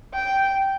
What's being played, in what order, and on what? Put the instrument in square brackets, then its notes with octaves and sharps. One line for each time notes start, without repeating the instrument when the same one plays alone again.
[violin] G5